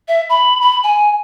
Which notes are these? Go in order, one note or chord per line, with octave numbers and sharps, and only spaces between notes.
E5
B5
B5
G#5